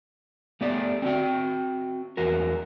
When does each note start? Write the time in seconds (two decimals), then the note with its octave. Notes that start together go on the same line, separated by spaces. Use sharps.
0.61 A3 B3 G4 D5
1.02 C4 F#4 G5
2.17 E2 F#4 A#4